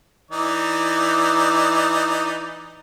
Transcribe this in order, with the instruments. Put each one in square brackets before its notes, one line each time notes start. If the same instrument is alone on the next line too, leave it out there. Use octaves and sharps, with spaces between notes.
[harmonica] E3 D#4 D5